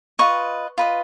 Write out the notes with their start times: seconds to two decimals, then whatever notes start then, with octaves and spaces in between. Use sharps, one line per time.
0.19 F4 B4 D#5 C#6
0.78 F4 B4 D#5